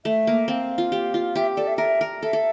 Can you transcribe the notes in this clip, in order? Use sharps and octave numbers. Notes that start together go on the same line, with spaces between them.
A3 E5
A#3
C4 F5
F4
G4
F4
G4 E5
A4 D5
E5
A#4 E5
A#4
A4 E5
A4